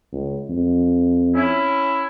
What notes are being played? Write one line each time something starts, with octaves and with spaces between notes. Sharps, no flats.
C#2
F2
C#4 E4